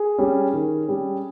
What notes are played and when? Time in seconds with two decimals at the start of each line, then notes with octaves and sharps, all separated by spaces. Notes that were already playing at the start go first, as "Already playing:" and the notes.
Already playing: G#4
0.18 G3 C#4
0.54 D#3
0.88 G3 C#4